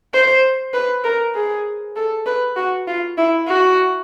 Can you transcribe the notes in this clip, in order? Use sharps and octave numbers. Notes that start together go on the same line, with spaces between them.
C5
B4
A#4
G#4
A4
B4
F#4
F4
E4
F#4